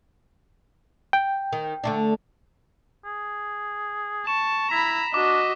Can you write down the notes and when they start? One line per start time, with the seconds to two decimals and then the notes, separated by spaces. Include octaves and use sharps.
1.13 G5
1.53 D#3
1.84 D3 A3 D4
3.05 G#4
4.27 A5 C#6 E7
4.71 E4 A#5 B5 B6
5.14 D4 F#4 D#5 D6